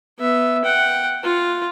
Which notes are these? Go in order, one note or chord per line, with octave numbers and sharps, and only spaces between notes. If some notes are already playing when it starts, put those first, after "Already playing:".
B3 E5
F#5 G5
F4